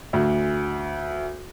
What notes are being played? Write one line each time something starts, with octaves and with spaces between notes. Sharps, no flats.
D2